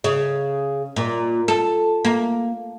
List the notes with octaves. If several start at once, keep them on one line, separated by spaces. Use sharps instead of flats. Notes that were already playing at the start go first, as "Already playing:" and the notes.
C#3
A#2
A4
A#3